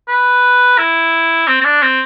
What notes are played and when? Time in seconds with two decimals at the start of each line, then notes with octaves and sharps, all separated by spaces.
0.09 B4
0.78 E4
1.48 C4
1.61 C4
1.65 D4
1.83 C4